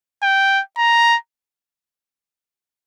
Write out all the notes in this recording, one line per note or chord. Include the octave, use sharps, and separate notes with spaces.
G5
A#5